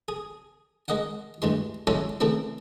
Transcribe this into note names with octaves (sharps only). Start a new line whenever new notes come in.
G#4
G#3 A#3 D#5 F5 F#5
D2 G2 E3 G#3 C6
F#3 G#3 C#4 E4 F4 A4
C#3 E3 A3 A#3 C4 E4